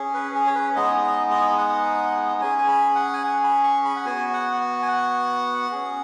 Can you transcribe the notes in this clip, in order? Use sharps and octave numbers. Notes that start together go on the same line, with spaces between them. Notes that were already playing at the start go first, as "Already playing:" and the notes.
Already playing: C#4 G#4
B4
G#4
C#5
B4
G#3 B3 D#4 D#5
D#5
D#5
F#5
C#4 G#4 G#5
G#5
B5
F#5
G#5
F#5
B5
C#6
B5
F#5
B3 F#4 G#5
F#5
G#5
F#5
C#4 G#4